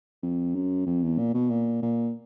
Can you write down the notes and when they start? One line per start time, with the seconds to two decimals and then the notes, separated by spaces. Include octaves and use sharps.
0.23 F2
0.55 F#2
0.86 F2
1.03 E2
1.18 A#2
1.34 B2
1.50 A#2
1.82 A#2